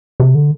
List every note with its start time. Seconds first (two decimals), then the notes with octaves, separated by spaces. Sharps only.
0.20 C3
0.35 D3